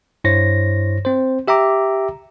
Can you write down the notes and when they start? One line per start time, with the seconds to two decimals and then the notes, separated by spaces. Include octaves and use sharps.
0.24 G2 E4 C5 C#5 A#6
1.05 C4 C5
1.48 G4 E5 G5 A#5 D6